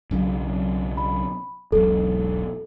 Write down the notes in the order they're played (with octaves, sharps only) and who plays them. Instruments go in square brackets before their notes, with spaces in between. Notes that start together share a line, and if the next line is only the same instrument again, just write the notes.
[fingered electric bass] B1 C#3 F#3
[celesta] B5
[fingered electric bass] E1 B1 [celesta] A4